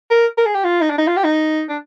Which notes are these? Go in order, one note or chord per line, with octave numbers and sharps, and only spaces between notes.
A#4
A#4
G#4
G4
F4
D#4
D4
D#4
F4
G4
D#4
D4